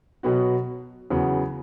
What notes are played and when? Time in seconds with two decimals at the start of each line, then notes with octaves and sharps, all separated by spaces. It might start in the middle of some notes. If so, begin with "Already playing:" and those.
0.23 B2 F#3 B3 F#4
1.10 E2 C#3 F#3 B3